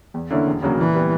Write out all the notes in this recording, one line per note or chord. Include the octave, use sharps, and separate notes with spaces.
E2
D3 A#3 C#4 E4
E1
D2 C#3 F#3 A#3
A#2 E3
G3 B3